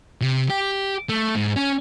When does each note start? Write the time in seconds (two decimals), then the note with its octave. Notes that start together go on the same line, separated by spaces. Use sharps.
0.21 C3
0.49 G4
1.09 A3
1.35 G#2
1.56 C#4